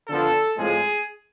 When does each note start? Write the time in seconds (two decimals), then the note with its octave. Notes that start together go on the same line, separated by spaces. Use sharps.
0.08 D3 F3 B3 A4
0.57 A2 F3 G#3 C4 G#4